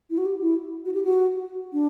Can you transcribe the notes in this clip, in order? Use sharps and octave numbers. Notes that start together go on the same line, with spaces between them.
E4
F#4
G4
E4
F#4
G4
F#4
D4